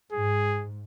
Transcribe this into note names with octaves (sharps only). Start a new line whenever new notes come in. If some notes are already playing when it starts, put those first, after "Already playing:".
G#2 G#4